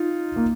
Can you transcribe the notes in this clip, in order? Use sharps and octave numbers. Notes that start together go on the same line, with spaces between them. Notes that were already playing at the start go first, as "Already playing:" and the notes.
Already playing: D#4 F4
A#3